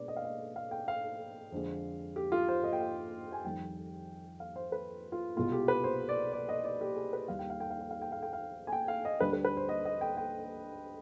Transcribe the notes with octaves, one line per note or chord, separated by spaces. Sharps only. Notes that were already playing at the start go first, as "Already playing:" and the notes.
Already playing: B2 G#3 D4 B4 D5
D#5
F5
D#5
F5
G5
F5
F2 D3 G#3
G4
F4
C5
D#5
G5
F5
G#5
F2 D#3 G3 G5
F5
C5
B4
F4
C2 B2 G#3 B3 F4
G4
B4
C5
D5
D5
D#5
D5
G4
G#4
B4
D#2 D#3 G3 F5
G5
F5
G5
F5
G5
F5
G5
F5
G5
F5
G#5
G5
F5
D#5
D2 D3 G3 D4 B4
B4
B4
C5
D#5
D#5
G5
G5